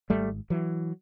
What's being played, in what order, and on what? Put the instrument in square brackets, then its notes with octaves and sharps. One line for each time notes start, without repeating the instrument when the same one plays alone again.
[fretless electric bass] G#1 G#2 G3 A3
E3 F#3